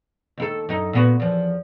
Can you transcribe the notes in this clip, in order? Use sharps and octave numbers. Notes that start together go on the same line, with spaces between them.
D#2 E4 A4
F#2 D#4
A#2 B3 F#4
E2 F3